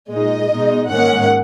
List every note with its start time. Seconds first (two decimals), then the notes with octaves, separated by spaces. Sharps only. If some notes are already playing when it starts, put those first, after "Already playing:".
0.11 A#2 G#3 D#4 D#5
0.51 B2 G#3 D#4
0.89 G#2 D#3 A#3 C#4 F#5